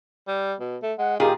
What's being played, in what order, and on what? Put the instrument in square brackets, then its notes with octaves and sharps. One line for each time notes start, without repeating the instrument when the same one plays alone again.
[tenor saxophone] G3
B2
A3
[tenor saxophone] G#3 [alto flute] F#5
[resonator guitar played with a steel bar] A#2 F4 G#4 [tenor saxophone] D#3 [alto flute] G4